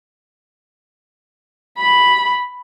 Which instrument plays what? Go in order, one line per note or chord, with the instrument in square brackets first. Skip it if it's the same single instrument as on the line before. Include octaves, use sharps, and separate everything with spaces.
[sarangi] B5